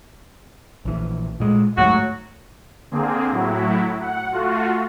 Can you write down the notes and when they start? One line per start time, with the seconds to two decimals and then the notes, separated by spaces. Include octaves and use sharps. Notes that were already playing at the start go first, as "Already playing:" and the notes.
0.85 A#1 E3
1.40 A#2 G#3
1.78 D2 G#2 F#3 A3 F#4
2.91 D3 A#3 C4 G#4
3.31 A2 F#3 E4
4.01 F#5
4.31 A3 F4 F#4